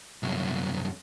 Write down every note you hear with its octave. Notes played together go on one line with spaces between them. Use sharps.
C2 F#2